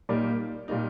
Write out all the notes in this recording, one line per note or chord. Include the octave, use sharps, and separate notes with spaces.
A#2 G3 A#3 D#4 D5
A#2 G3 A#3 D#4